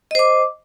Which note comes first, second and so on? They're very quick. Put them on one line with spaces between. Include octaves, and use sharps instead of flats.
D#5 C5 D6